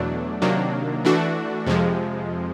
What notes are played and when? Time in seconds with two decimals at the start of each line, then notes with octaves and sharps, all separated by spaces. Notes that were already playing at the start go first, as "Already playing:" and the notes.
Already playing: E2 B2 F#3 A3 D4
0.42 C3 D#3 F#3 A#3 D4
1.05 E3 A3 D4 F#4
1.67 F2 C3 F3 G#3